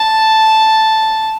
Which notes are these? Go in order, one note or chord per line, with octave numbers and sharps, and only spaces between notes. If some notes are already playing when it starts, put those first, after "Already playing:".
Already playing: A5